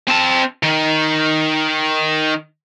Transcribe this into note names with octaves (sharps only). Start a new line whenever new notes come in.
C4 A5
D#3